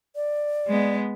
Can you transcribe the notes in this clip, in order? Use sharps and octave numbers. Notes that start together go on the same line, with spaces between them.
D5
G#3 B3